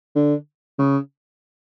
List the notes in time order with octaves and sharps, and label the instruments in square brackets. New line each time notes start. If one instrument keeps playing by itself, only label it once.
[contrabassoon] D3
C#3